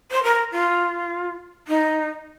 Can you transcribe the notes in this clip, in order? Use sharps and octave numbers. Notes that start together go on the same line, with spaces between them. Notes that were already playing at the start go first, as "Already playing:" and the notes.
C5
A#4
F4
D#4